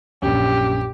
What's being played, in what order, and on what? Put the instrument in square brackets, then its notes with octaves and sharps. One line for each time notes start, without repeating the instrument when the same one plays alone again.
[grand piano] A#1 F#2 [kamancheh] G4